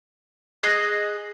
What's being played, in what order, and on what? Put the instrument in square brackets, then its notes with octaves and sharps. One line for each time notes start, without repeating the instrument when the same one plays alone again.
[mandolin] G#4 D#5 F#6